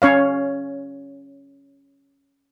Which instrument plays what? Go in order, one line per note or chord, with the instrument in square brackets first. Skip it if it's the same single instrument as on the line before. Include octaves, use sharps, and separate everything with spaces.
[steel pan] C#4 C#5 F5